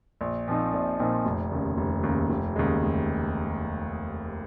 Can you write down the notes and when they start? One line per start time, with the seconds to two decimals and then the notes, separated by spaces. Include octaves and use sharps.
0.21 A#1
0.48 A#2 F3 C4 D#4
0.74 A#1
0.99 A#2 F3 C4 D#4
1.25 F1
1.52 D#2 C#3
1.77 F1
2.03 D#2 C#3
2.30 F1
2.56 D#2 C#3 G#3
2.82 F1